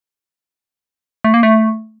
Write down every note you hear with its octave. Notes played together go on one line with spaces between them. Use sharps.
A3
A#3
A3